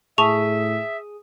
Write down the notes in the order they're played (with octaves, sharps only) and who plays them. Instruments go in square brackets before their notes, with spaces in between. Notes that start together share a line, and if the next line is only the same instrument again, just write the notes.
[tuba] A2 [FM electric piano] G#4 D#6 [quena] E5 [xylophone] A5 C#6 F7